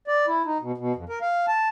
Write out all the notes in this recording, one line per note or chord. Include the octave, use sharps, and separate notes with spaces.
D5
E4
D#4
B2
B2
F2
A#4
F5
A5